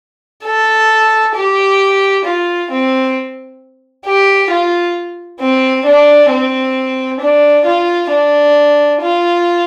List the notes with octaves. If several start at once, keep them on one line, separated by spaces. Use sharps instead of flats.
A4
G4
F4
C4
G4
F4
C4
D4
C4
D4
F4
D4
F4